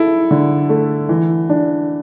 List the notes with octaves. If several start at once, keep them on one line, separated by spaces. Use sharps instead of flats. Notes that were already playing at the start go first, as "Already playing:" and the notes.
Already playing: E4 A4
D3
A3
E3
D4